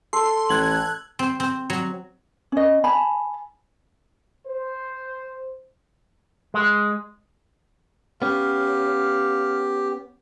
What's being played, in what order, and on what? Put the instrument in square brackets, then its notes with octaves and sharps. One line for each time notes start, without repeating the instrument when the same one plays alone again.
[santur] A4 [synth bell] C6
[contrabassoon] A1 [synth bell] F#6 G#6 F#7
[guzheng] C4
C4
F#3
[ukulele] C#4 D#5
G#5 A5 B5
[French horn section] C5
[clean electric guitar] G#3
[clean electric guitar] B3 C#4 [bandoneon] G4 [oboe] F5